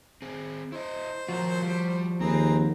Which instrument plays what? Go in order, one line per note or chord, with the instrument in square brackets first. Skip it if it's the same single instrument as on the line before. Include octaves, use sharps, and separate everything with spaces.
[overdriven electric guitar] C4 G#4
[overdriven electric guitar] E4 D#5 [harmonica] C5
[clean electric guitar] F3 F#4 [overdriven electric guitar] F4 A#4
[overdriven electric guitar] G3
[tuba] D#2 [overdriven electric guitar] C4 [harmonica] G#4 B4 A#5